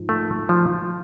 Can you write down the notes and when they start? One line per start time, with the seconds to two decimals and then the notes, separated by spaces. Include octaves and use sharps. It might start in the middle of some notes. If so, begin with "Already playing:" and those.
Already playing: G#2 F3
0.09 A3
0.49 F3